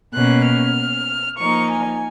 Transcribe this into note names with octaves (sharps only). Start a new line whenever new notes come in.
B2 A#3 C#4 F#6
F6
F3 A#3 D#4 C#6
G#5